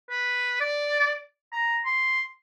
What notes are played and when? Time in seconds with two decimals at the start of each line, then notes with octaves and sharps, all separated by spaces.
0.10 B4
0.61 D5
1.53 A#5
1.86 C6